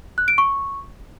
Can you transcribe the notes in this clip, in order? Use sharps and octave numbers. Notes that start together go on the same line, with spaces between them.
F#6
D7
C#6